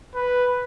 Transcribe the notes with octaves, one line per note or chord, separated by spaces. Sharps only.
B4